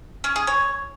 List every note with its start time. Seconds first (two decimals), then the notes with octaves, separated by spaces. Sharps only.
0.24 C#4
0.36 G#4
0.47 C#5